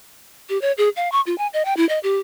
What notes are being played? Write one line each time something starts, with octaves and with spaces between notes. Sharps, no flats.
G4
C#5
G#4
F5
C#6
F4
G#5
D#5
G5
E4
D#5
G4